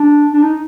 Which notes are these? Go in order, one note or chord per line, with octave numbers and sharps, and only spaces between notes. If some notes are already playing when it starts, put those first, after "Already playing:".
Already playing: D4
D4
D#4